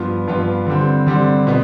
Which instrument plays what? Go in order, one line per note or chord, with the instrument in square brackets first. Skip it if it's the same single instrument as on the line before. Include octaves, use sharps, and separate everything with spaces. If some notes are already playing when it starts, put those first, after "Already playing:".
Already playing: [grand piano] G2 F3 B3 F4
G2 F3 B3 F4
D3 G3 C4
D3 G3 C4
B2 B3